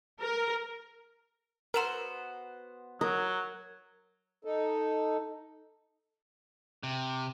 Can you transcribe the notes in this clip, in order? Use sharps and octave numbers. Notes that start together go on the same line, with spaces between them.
A#4
B3 F#4 A#4 C5 E6
F#3 A#4 D#5
D#4 A4
C3